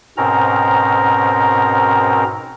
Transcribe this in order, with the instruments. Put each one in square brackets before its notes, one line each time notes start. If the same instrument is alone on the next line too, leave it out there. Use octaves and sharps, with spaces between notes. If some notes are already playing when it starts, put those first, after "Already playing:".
[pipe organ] G#2 B2 C4 C#4 A#4 A#5